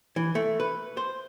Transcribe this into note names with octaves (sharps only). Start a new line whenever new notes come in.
E3
A3
B4
C5